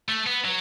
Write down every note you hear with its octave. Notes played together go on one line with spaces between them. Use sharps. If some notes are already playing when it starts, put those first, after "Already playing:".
A3
B3
F#3